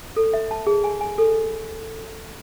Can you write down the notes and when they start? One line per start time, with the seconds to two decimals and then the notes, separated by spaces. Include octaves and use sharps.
0.16 A4
0.34 E5
0.51 A5
0.67 G#4
0.84 G#5
1.01 G#5
1.18 A4